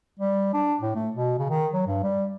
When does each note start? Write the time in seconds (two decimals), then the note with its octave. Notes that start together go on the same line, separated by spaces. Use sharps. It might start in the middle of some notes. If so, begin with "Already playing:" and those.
0.19 G3
0.54 D4
0.81 A2
0.95 A3
1.14 B2
1.39 C#3
1.50 D#3
1.73 F#3
1.87 G2
2.03 G3